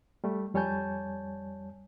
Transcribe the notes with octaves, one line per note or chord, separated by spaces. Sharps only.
G3 A3
F2 G3 C#5 G#5 A5 G6